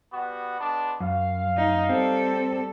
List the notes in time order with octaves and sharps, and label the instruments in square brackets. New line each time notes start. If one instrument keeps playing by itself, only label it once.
[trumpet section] G3 B3 F#4
G#3 B3 D4
[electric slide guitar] F#2 [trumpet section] F5
[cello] D#4
[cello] G3 A4 [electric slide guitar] C4